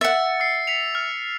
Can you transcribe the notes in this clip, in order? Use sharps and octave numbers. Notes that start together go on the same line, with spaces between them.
E5 F#5 A6 C#7
E6 C7
B6 C#7 F7
F6